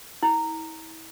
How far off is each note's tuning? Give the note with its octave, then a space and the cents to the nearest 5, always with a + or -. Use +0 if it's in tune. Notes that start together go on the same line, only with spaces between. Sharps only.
E4 -35